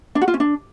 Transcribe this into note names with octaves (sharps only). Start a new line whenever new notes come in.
D4
F#4
F4
C#4
D4